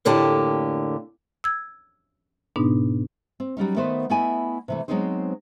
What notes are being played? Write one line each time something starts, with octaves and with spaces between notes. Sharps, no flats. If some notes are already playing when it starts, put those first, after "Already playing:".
F2 A2 D3 A#3 G4 A5
E6 G#6
G#2 B2 B3 D4 D#4
C4
F#3 G3 C#4 D#4
D#3 A3 B3 B4 C5
A3 B3 E4 D#5 G#5
C3 E3 A3
F#3 G#3 B3 C4 D#4 C5